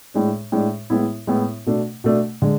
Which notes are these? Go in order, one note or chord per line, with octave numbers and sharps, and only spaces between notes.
A2 G#3 D4
A2 G#3 D4
A2 G#3 B3 E4
A2 G#3 B3 E4
B2 A3 D4
B2 A3 D4
D3 G#3